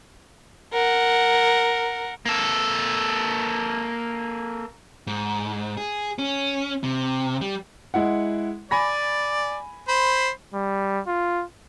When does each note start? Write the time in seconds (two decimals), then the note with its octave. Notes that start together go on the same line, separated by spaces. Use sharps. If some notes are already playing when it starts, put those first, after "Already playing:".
0.73 A#4 F#5
2.26 A#3 A4
5.07 G#2
5.77 G#4
6.19 C#4
6.83 C3
7.41 G3
7.94 G#3 E4 F#5
8.71 D5 G#5 B5 A#6
9.88 C5 B5
10.54 G3
11.07 F4